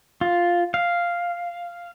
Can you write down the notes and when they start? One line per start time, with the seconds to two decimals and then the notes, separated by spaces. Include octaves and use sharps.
0.21 F4
0.74 F5